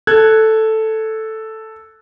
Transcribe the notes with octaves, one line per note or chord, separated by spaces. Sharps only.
A4 F#6 G#6